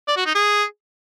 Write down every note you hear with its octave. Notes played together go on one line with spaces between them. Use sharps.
D5
F#4
D#4
G#4